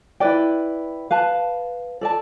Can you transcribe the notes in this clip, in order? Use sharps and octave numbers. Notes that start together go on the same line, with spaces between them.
E4 B4 D5 G5
B4 F5 A5
A4 D5 A5